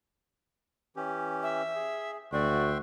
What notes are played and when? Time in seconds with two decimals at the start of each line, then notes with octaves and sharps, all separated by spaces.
0.96 E3 C#4 G4
1.43 E5
1.75 G#4
2.33 D2 F#4 D5 E5 G5 C6